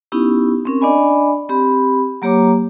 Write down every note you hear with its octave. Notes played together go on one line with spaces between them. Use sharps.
B3 C#4 D#4 E4 G4
C4 C#4 A#4
D4 D5 D#5 G#5 B5
C4 G4 B5
F#3 A#3 G4 C#5 A#5 D6